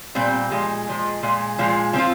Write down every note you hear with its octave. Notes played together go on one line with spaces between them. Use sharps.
A#2 G3 C4
A#2 F3 G#3
A#2 F3 G#3
A#2 F3 G#3
A#2 F3 G#3
F3 C4 F4